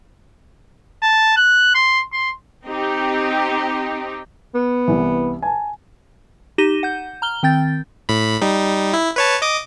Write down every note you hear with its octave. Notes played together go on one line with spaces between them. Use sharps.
A5
F#6
C6
C6
C4 D#4 G4
B3
C2 E3
G#5 A5
D#4 G4 A#6 D#7 E7 G7
F#5 G6
A#5 F6 G7
D#3 C4 G5 G6 A6
A2 B5
G3 D#4
E4
B4 C#5 A5
D#5 D6 D#6